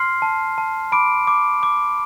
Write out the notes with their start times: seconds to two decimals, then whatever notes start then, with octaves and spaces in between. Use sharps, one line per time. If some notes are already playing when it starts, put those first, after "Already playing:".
Already playing: C6 F6 C7
0.22 A5
0.58 A5
0.92 B5 D6 D7
1.27 D6
1.63 D6